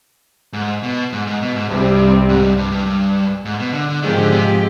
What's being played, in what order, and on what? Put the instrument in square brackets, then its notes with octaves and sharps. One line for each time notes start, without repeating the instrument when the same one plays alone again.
[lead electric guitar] G#2
B2
G#2
G#2
B2
G#2
[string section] C2 C3 G3 C4 [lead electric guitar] G2
[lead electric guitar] G#2
G2
G2
G2
G2
G#2
B2
D3
D3
[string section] G#2 F3 G#3 C4 G4 [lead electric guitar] D#3
[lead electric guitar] D3
C3